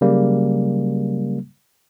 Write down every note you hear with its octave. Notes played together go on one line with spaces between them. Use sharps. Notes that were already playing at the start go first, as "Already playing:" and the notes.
C#3 F#3 G3 A#3